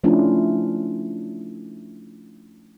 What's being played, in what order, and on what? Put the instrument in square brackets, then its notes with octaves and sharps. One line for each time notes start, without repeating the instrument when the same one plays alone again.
[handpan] F3 A3 C#4 D4 E4 F4